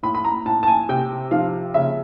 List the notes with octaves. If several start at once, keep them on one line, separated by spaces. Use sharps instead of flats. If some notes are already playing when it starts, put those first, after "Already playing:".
A2 B5
B5
A#5
A2 A5
A5
G#5
C3 G5
F3 F5
C#3 E5